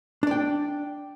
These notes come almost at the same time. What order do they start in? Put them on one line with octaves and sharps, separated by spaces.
D4 D5 G5